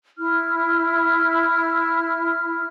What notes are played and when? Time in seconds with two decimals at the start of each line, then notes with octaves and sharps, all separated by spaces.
0.18 E4 F6